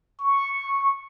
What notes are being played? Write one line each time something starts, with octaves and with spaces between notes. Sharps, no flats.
C#6